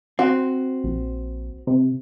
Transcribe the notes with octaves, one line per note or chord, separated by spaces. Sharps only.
C4 F#4
A#1
C3